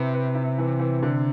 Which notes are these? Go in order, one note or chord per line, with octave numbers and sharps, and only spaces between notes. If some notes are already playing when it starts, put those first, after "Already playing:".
Already playing: C3 E4 B4
B4
E4
E3
E3
D3